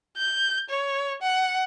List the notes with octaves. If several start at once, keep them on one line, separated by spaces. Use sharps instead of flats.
G6
C#5
F#5